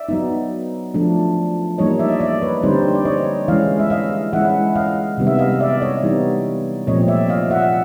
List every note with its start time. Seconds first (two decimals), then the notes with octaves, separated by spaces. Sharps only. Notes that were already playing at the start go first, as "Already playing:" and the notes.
Already playing: D5 E5
0.09 F#3 B3 D#4
0.94 F3 A3 D4
1.78 E3 G3 A#3 D#4 C#5 D#5
1.99 D5 E5
2.11 D#5
2.21 D5 E5
2.42 B4 C#5
2.63 D3 G3 C4 D#4 C5 D5
2.95 D5
3.05 C#5 D#5
3.48 E3 G#3 C#4 D#5 F5
3.79 E5
3.90 D#5 F5
4.33 E3 G#3 C#4 E4 E5 F#5
4.75 D#5 F5
5.18 C3 D#3 G3 B3
5.27 E5
5.39 D#5 F5
5.60 D5 E5
5.82 C#5 D#5
6.03 E3 G3 B3 D#4
6.87 A#2 F3 A3 C4 C#5 D#5
7.08 D5 E5
7.29 D#5 F5
7.51 E5 F#5